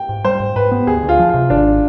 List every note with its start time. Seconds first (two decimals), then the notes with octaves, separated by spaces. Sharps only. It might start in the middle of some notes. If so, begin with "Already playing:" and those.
Already playing: G5
0.09 G#2
0.24 G3 C5
0.40 G#2
0.56 G#2 B4
0.72 B3
0.87 D2 G#4
1.03 D2
1.09 F4
1.19 F3
1.29 F4
1.34 C3
1.50 G#1 D4